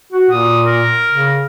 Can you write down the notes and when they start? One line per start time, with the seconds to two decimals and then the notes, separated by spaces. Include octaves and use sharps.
0.12 F#4
0.30 A#2 D#6
0.65 A#4
1.11 C#3